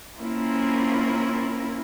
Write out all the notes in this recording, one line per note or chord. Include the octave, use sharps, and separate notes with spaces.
A#3 C4 C#4 E4 F4 A#4